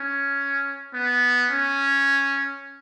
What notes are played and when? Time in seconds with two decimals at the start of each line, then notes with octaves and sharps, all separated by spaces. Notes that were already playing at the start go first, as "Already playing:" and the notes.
Already playing: C#4
0.94 B3
1.51 C#4